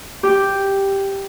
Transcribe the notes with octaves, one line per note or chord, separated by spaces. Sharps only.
G4